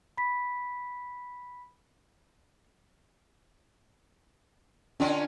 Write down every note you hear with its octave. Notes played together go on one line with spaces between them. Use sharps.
B5 B6
D3 C#4 D4 F4